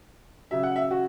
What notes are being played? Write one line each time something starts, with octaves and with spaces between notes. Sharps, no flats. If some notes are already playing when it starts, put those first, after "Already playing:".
C#3 F#3 E5
F#5
E5
F#4